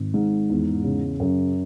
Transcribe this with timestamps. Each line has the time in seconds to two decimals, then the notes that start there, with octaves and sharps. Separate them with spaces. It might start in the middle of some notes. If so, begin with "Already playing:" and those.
Already playing: G#1
0.14 G#2
0.50 E2
0.84 C#3
1.20 F#2